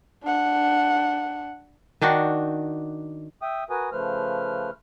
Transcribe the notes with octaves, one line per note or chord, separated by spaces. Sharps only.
D4 F#5
D#3 D4 D#4 F#4
E5 G5 D#6
F#4 A#4 B4 G#5 D#6
C#3 F3 A3 B4 C5 F6